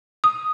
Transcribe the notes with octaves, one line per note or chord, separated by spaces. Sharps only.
D#6